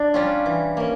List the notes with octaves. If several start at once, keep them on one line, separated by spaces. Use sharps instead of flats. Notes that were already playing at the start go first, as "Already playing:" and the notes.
Already playing: D4
G3 C#4 F4
E3
A#3 C#4